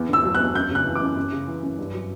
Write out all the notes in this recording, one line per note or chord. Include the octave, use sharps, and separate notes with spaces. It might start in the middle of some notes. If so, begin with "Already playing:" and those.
Already playing: E2
D3 E6
F#3
F#6
E2
F#2 G6
C#3 F#6
E3
D6
F#2
F#2
C#3
E3
F#2
G2
F#3